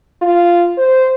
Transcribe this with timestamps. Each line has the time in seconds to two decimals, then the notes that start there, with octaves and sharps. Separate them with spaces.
0.22 F4
0.78 C5